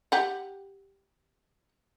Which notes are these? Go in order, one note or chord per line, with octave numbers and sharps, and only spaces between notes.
G4 F#5